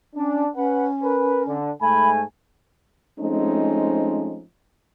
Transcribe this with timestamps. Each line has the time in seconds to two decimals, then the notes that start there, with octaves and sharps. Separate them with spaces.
0.16 C#4 D4
0.56 C#4 B4 F#5
1.03 A#4 B4
1.47 D3
1.81 G#2 A3 G#5 B5
3.19 F3 G#3 A3 C4 C#4 D#4